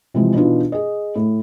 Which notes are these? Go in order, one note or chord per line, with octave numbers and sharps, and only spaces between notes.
C3 E3 F3 G#3
B2 E3 D4 D#4 F4 B4
G#4 D#5
A2